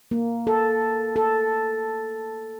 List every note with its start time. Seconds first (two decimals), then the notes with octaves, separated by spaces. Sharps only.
0.11 A#3
0.47 A4
1.16 A4